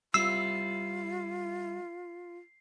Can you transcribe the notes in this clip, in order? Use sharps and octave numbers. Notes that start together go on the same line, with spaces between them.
G3 E4 F4 E6 C7